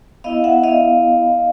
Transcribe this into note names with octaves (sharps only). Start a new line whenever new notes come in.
B3 E4 D#5 F5
E5 F#5
D#5 F5